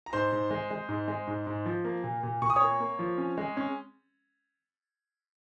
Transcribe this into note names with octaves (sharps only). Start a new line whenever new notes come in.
A#5
G#2 C5 C6
G#2
G#3
G#3
G#2
G#3
G#2
G#2
F3
A#3
A#2
A#2
A#2 C#6
D#6
C#5 C#6
A#3
A#3
F3
C#4
G#3
C#4